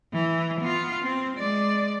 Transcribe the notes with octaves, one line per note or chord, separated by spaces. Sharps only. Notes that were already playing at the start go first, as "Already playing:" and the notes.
E3
B3 F4
C4
G#3 D5